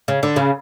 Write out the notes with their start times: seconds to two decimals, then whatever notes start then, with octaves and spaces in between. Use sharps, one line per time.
0.08 C#3
0.23 D3
0.36 C#3